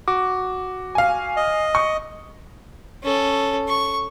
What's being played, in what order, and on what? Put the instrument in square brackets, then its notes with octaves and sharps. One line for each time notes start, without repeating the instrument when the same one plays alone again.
[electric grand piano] F#4 [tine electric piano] D6
[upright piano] F5 G#5
[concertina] D#5
[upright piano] C#6
[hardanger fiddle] C#4 A4
C#6